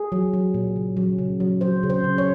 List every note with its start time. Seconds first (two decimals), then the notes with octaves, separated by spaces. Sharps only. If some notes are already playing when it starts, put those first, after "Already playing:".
Already playing: G#4
0.12 F#3
0.33 F#3
0.54 A#2
0.76 C#3
0.97 F#3
1.18 C#3
1.40 F#3
1.61 F#3 C5
1.83 C#3
1.90 C5
2.04 C#3
2.18 C#5